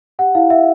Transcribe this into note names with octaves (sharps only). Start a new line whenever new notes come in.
G4 F#5
E4 F5
E4 E5